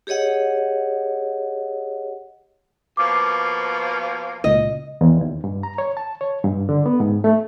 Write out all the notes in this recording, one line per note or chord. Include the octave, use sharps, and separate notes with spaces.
G4 G#4 C#5 D#5 F#5
B2 F3 A#3 D6
C#2 A#2 D#5
E2
D#2
G2
A#5
C#5
A5
C#5
G2
D3
B3
G#2
A3